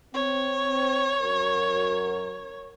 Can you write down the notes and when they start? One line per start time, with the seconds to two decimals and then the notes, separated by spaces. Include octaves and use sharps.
0.14 C4 C#5
1.21 F#2 F#4 A#4